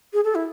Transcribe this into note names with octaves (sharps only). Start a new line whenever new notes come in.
G#4
A4
E4